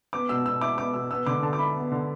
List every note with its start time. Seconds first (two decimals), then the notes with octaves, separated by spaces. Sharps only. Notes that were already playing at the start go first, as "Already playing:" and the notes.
0.13 B3 D6
0.29 B2 E6
0.46 B2 E6
0.61 E4 D6
0.77 B3 D6
0.94 B2 E6
1.10 B3 E6
1.26 D3 D6
1.42 D3 A5
1.53 D6
1.59 E4 B5
1.76 B3
1.92 D3